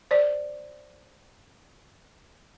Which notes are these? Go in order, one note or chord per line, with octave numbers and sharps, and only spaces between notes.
C5 D5